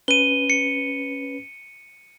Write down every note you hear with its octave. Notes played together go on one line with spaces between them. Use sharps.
C#4 B4 D#7 G7
C#7